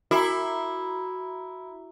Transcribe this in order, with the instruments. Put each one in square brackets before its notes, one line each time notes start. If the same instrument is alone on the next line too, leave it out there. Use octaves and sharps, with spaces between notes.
[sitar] E4 [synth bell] F#4 E5 A#5